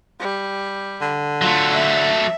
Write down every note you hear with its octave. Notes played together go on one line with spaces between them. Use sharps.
G3
D3
F#3 A3 F4
E5